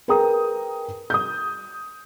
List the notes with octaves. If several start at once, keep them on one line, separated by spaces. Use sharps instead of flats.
G#4 A#4 B4 G5 A#5 D#6
D#6 G6